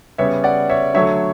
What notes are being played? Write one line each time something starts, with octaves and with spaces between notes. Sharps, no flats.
C#3 G3 B3 C#5 E5
D5 F#5
C#5 E5
D3 F#3 A3 C#5 E5